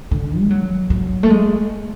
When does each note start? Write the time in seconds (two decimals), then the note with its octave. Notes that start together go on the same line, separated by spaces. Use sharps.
0.11 D3
0.40 G#3
0.50 F#3
0.90 F#3
1.23 A3
1.30 G#3